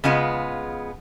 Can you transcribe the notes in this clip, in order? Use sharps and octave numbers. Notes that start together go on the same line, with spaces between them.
C#3 G#3 B3 F4